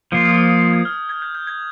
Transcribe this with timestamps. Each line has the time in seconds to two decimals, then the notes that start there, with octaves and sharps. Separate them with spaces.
0.11 F3 A#3 F4 G6
0.25 D#6
0.36 D#6
0.49 D#6
0.61 D#6
0.73 G#6
0.85 F6
1.09 G#6
1.22 G6
1.35 G6
1.47 G#6